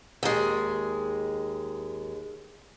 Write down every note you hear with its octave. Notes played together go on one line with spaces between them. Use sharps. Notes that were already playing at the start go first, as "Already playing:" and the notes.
D#2 G#3